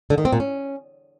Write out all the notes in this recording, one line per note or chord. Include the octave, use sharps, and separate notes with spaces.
D3
D#3
C4
A#2
C#4